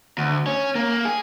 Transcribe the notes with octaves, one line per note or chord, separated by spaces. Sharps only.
D2
C#4
A#3
G#4